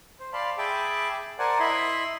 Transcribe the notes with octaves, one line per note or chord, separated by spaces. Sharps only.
C5
D5 F5 A5 B5 C6
G#4 E5 G5 A5 B5 D6
A#4 C5 D5 F#5 G#5 A5
E4 D#5 E5 B5 C6